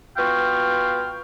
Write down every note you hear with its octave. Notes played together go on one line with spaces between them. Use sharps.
B3 F4 F#4 F5 G5